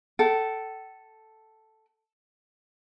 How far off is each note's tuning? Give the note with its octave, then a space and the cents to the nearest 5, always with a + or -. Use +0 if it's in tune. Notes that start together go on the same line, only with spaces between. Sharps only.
A4 +0 G5 -45